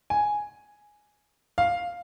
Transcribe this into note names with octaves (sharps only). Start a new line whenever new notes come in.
G#5
F5